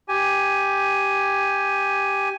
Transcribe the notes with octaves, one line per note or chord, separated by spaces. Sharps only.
G4 G#5